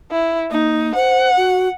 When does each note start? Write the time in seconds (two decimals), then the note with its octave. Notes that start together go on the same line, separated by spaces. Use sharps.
0.11 E4
0.51 A#3 D#4
0.95 C5 F#5
1.37 F#4